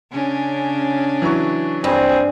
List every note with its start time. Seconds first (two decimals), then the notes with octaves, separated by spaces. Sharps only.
0.12 C#3 C#4 D4
1.22 E3 F#3 C#6
1.84 G2 C4 G#4